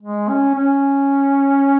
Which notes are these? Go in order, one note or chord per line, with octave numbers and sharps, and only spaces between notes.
G#3
C#4
C#4